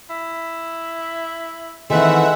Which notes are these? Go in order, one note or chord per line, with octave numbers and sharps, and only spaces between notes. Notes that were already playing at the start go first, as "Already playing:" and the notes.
E4
D#3 E3 G#3 A3 C4 E5 F#5